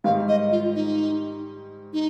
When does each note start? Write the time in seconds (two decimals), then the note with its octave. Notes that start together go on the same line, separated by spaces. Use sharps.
0.04 G#2 D#3 G3 F5
0.28 D#5
0.51 F4
0.75 D#4
1.93 D#4